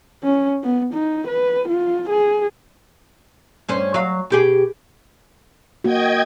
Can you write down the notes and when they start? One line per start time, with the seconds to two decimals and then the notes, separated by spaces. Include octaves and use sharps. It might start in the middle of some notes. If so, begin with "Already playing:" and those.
0.23 C#4
0.63 B3
0.94 D#4
1.28 B4
1.68 F4
2.09 G#4
3.68 G2 C#4 C5
3.94 F#3 F5
4.30 B2 G4 G#4
5.84 A#3 F#4 D#5 G5 G#6